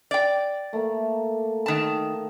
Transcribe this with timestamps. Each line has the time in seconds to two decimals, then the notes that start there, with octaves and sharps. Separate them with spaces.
0.11 D5 G5
0.73 A3 A#3
1.66 D#3 A5